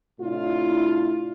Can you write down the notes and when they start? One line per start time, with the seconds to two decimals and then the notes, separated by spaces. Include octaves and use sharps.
0.20 A2 C3 D4 E4 F4